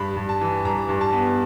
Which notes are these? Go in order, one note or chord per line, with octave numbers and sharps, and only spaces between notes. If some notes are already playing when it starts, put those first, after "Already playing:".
Already playing: G2 B5
G2
A5
E3
G2 A#5
G2
A5
B3